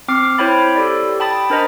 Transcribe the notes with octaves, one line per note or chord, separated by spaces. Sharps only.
C4 D6 F6 C7
E4 C5 C#5 G5 B5 A6
G4 A4 D5
G5 A5 B5 D#6 A6
D4 A#4 C5 D#5 A#5 B5